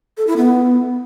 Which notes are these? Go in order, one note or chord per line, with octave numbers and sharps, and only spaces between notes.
A4
E4
B3